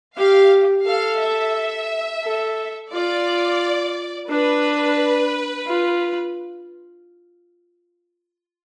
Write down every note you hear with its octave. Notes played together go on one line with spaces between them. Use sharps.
G4 F5
A4 F5
E5
A4
F4 D5
D4 B4
F4